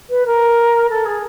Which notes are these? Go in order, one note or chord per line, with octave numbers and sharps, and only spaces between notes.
B4
A#4
A4
G#4